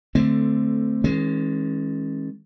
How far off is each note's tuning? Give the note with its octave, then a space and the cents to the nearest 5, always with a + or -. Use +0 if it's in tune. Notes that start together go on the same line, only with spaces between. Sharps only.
D3 +10 A3 +0 C4 -10
D#3 +45 G#3 +0 C#4 -30